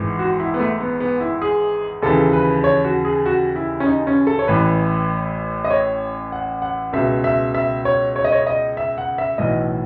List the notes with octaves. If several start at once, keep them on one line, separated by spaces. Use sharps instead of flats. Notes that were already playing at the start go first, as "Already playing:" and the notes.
Already playing: G#1 G#2 E3
F#4
E4
B3
A3
B3
B3
E4
G#4
D#2 C#3 E3 A4
B4
C#5
F#4
G#4
F#4
E4
C#4
D#4
C#4
A4
C#5
A1 A2 E3 B4
D#5
C#5
F#5
F#5
C#2 B2 E5
E5
E5
C#5
C#5
D#5
C#5
D#5
E5
F#5
E5
B1 A2 E3 D#5